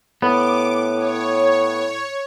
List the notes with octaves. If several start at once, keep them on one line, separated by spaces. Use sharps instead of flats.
A2 B3 D6
C#5